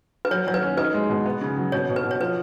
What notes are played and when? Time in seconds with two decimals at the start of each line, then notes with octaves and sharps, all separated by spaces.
0.25 B4
0.31 F#3 C#5
0.47 F#3 C#5
0.54 B4
0.62 C#4
0.77 D#4 B4
0.94 G#3
1.09 B2
1.26 B3
1.41 C#3
1.57 F#3
1.72 B2 C#5
1.89 B2
1.96 B4
2.04 B2
2.11 C#5
2.20 F3 B4